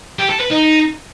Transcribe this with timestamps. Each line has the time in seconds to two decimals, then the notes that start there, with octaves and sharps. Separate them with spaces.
0.19 G4
0.30 A4
0.40 B4
0.51 D#4